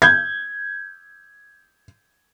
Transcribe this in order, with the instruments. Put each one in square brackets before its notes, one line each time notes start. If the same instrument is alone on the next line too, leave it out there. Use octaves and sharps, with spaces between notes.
[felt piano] G6 G#6